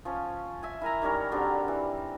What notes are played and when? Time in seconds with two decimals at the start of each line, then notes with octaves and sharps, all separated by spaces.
0.05 F3 C#4
0.63 E5 G#5
0.81 E4 A#4 G#5 A#5
1.02 D#3 G3 C#4 A#4
1.32 D3 F#3 G3 C4
1.68 E3